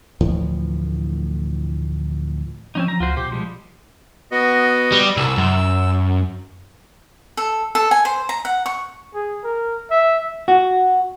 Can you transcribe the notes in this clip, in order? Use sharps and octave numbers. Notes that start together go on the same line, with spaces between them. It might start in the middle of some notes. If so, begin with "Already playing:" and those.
D2 A2 E3 F3
F3 C4 C#4 D#4
F3 A#5
C#2 F4 F#4 C5
B2 G4 C5
F3 G3 G#3
B3 F#4 D#5
G3
C2 E6
F#2
A4
A4
G#5
C5
A#5
F#5
C#6
G#4
A#4
E5
F#4